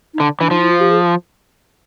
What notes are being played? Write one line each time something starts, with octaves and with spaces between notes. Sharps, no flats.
D#4
D3 D4
E3 D4
F3 D#4
E4
F4
G4
G#4